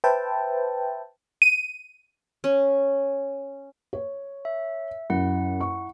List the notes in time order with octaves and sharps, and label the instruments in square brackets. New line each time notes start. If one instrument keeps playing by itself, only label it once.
[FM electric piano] B4 C5 E5 G5 A5
[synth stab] D#7
[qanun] C#4
[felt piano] C#5
[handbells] E5
[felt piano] F#2 [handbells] E4 F#5
[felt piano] C#6